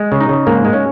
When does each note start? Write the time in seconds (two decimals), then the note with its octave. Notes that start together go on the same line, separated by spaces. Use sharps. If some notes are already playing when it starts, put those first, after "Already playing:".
Already playing: G#3
0.12 C#3
0.21 D#4
0.29 C#3
0.47 G#2 A#3
0.65 G#3
0.73 C#4